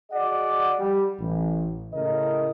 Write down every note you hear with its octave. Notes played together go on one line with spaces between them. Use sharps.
F#4 G#4 D5 D#5 F#5
G3
A1
A2 C#3 A#4 D#5